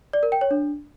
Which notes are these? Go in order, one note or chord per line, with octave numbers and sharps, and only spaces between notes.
D5
A#4
G5
C#5
D4